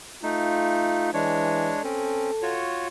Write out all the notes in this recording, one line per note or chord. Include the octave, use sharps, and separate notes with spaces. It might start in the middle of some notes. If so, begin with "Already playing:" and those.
A3 D#4 F4
E3 G#3 D4 C#5
C4 C#4 A4
F4 F#4 C#5